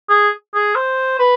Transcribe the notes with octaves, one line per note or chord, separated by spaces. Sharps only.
G#4
G#4
C5
B4